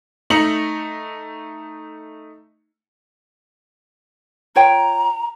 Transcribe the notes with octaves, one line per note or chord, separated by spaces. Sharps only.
A3 D#4 A#5 C#7 F#7
F4 C#5 G5 A#5